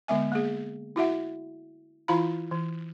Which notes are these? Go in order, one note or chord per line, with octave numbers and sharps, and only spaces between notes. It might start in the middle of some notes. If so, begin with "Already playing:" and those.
D3 G#3 B3 E5 G#5
A#3 G#4
E4 F#4 E5 F#5
E3 E4 F4 F5 A#5 B5
E3